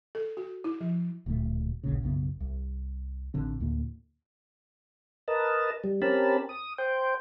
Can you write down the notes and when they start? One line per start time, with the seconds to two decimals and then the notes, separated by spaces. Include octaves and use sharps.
0.15 A4
0.37 F#4
0.64 E4
0.81 F3
1.26 D1 D2 A#2 A3
1.84 A1 D2 A#2 C#3
2.03 B1 F#2 C#3 B3
2.40 C2
3.34 A1 D3 C4
3.60 D2 A2 D3 A#3
5.28 A#4 B4 D#5 A5
5.84 G3
6.02 C4 C#4 G4 A#4 A5 B5
6.49 D#6
6.78 C5 G5